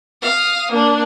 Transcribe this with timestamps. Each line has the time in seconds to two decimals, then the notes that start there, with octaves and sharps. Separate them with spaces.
0.22 F5 D#6
0.71 A#3 D4